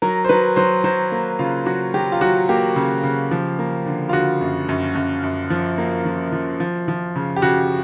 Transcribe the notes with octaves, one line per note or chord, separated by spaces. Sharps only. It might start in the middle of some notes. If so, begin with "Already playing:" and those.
F#3 A#4
C5
F#3 B4
F#3 C5
F#3 C5
A#3
C#3 F4
F#3 F#4
F#3 G4
F4
F#3 F#4
A#3 G4
C#3
C#3
F3
A#3
D3
F4
D3 F#4
F#2
F#2
F#2
F#2
F3
A#3
F3
F3
F3
F3
C#3
G4
C#3 F#4